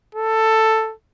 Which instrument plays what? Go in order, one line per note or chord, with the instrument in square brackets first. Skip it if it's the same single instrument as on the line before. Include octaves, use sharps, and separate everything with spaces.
[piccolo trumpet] A4